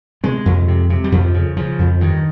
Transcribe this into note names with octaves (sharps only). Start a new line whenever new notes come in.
C3 G#3
F2
C3
C3
G3
F2 F3
C#3
C#3 F3
F2
G2 D#3